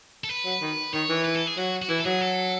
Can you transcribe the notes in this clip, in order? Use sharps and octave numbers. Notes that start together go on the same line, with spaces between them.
A4
B4
F#3
D#3
D#3 C#5
E3
B4
A4
G#4
F#3 F#4
F#4
E3 E4
A4
F#3 G#4
A4